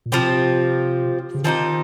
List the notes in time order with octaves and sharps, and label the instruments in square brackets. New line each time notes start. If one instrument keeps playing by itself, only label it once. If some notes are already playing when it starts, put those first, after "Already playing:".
[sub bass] A#2
[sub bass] C3 [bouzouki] F3 C4 G4
[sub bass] C#3
[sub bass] D#3 [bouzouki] F3 C4 D#4 G4